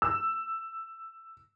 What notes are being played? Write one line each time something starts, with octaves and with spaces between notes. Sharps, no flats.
E6